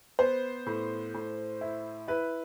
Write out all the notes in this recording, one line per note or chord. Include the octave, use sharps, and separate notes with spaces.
B3 C5
A2
A2
E4
E4 B4